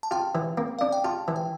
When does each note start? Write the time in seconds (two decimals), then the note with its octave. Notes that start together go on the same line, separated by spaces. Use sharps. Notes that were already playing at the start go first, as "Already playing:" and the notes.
0.03 A5
0.11 F4 G5
0.35 E3
0.58 A#3
0.79 D4 F5
0.92 G5
1.04 F4 A5
1.28 E3
1.36 G5